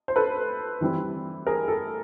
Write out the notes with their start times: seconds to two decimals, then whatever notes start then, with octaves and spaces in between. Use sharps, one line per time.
0.08 C5
0.16 A4 B4
0.81 E3 G3 C4 E4
1.47 G#4 A#4
1.68 A4